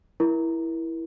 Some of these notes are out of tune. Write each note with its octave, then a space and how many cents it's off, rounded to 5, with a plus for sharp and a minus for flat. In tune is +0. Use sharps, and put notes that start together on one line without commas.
E4 +0 A#4 +30